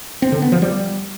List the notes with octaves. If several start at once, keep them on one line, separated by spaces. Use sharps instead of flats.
C4
D3
B3
F3
G3